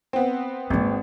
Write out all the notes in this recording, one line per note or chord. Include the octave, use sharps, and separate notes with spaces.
B3 C4
G#1 A#3 E4